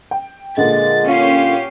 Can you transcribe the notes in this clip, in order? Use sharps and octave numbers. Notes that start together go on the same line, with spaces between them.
G5
A#2 D3 G#3 A6
C#4 F4 G4 C7